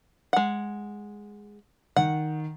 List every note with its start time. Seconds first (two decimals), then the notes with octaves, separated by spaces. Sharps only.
0.33 G#3 F#5
1.96 D#3 F#5